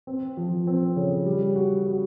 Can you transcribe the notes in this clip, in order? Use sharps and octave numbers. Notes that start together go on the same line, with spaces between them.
C4
F3
C4
C#3
G3
F#4
F#4